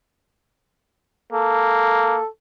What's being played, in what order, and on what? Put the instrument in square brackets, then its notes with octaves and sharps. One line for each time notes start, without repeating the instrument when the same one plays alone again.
[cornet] A#3 [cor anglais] A4